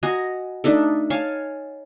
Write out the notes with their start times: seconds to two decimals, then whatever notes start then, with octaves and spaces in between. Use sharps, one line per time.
0.03 F#4 D#5 G#5 A#5
0.64 A3 D4 D#4 A4
1.10 C#5 F5 G#5 A5